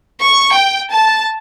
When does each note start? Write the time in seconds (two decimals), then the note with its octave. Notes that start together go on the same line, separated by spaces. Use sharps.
0.23 C#6
0.55 G5
0.92 A5